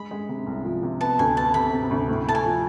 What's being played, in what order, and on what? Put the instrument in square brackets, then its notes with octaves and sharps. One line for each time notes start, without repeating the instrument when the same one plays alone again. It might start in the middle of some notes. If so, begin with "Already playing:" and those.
Already playing: [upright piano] G#3 [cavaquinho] B5
[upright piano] G#3
C3
C2
F3
C3
[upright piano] B3 [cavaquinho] A5
[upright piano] D2 [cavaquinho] G#5
[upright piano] B3 [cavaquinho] A5
[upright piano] C3 [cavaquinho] B5
[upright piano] C3
D2
A2
[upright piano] A3 [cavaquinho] A5
[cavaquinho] G#5
[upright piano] F3